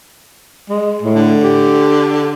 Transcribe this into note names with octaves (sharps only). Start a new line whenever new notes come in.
G#3
A2
D3
G4